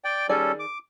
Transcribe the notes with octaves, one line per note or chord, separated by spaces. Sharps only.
D5 G5
D#3 G3 C#4 G#4 A4 D5
D6